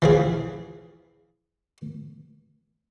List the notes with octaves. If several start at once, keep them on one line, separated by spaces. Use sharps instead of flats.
E3 F3 G#4